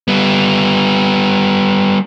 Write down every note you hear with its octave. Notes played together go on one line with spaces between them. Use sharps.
G3 B3